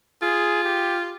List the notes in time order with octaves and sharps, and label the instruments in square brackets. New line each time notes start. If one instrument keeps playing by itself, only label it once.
[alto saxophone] F4 [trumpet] G#4
[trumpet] G4